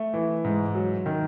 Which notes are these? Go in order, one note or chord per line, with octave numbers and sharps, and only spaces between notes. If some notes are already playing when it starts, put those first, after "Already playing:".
Already playing: A3
E3
G#2
F#3
D#3